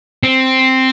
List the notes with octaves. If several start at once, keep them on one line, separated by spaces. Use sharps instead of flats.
C4